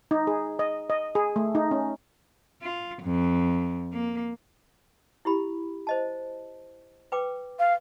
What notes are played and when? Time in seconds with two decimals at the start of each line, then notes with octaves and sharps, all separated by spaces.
0.11 D#4
0.27 G#4
0.59 D#5
0.90 D#5
1.15 G#4
1.36 A3
1.55 D#4
1.71 C#4
2.62 F4
3.03 F2
3.92 A#3
5.25 E4 G4 B5
5.87 C5 D#5 A5
7.12 B4 G5 D6
7.59 F5